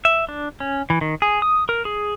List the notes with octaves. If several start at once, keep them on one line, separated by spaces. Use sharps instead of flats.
E5
D4
C#4
E3
D#3
G#4
D#6
A#4
G#4